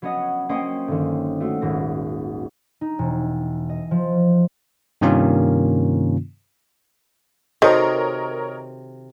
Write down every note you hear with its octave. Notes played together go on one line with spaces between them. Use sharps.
F#3 B3 C#4 C#5 D#5 F#5
A#3 C#4 C5 C#5 D#5 G5
G1 D#3
A3 F4 F#4
D#1 G#1 A#6
D#4
E1
D#5
F3
G2 C3 D#3 A#3 C#4 F4
C3 D#3 F#4 A4 A#4 C#5 D#5 A5